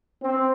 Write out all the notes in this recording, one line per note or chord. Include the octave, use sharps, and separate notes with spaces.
C4